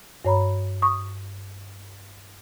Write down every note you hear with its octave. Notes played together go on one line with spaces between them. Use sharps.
G2 C#5 A#5 B5
C#6 D#6